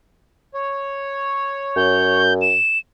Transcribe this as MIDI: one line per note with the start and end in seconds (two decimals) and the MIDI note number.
0.54 2.22 73
1.76 2.56 42
1.76 2.34 91
2.42 2.79 100